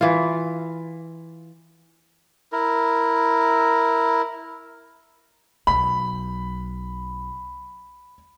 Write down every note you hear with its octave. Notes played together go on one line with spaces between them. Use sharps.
E3 F4
E4 A#4
B1 F#3 B5